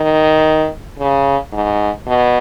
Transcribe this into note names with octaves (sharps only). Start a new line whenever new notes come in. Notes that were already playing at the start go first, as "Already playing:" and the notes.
Already playing: D#3
C#3
G#2
B2